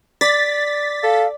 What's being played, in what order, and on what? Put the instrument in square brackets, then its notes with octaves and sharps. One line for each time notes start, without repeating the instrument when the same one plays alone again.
[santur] D5 [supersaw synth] A6 B6
[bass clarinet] A4 [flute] F5